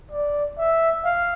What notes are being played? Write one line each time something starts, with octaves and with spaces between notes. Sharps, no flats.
D5
E5
F5